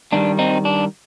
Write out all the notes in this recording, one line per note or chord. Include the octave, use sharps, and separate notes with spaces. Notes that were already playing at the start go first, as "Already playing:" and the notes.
G2 D#3 G3 D4
C4 D#4
D4